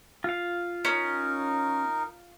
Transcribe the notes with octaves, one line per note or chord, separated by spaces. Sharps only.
F4 F5
C#4 D#4 A#4